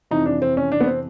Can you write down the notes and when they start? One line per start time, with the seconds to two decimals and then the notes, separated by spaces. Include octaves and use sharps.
0.11 F2 C3 E3 D#4
0.26 D4
0.42 C4
0.57 C#4
0.72 D4
0.81 B3
0.87 C4